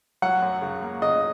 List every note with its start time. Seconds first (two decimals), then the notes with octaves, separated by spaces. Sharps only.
0.22 F#3 F#5
0.42 F#2
0.61 C#3
0.82 A#3
1.02 C#3 D#5